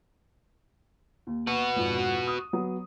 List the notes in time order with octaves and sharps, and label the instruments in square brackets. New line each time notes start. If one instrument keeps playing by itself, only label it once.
[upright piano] D#2
[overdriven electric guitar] F#4 B4
[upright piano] G#1 F2
D#6
F#3 B3